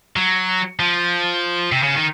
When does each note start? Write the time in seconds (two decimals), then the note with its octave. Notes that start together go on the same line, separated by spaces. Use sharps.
0.16 F#3
0.79 F3
1.72 C3
1.83 C#3
1.95 D#3